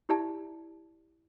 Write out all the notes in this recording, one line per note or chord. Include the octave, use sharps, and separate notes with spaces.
E4 G4 D5 E5 A5